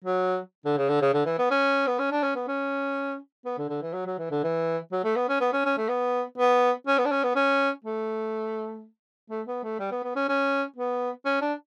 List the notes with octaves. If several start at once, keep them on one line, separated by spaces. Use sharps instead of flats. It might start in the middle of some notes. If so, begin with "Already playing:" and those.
F#3
D3
C#3
D3
C#3
D3
E3
B3
C#4
B3
C#4
D4
C#4
B3
C#4
B3
D3
D3
E3
F#3
F#3
E3
D3
E3
F#3
A3
B3
C#4
B3
C#4
C#4
A3
B3
B3
C#4
B3
D4
C#4
B3
C#4
A3
A3
B3
A3
G3
B3
B3
C#4
C#4
B3
C#4
D4